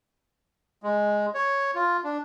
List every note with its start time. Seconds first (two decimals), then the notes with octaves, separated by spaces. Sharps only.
0.83 G#3
1.34 C#5
1.75 F4
2.04 D4